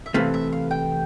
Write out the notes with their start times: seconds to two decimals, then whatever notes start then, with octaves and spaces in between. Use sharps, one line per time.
0.06 E5
0.14 C3 E3 A3 F5
0.34 E5
0.53 F5
0.71 G5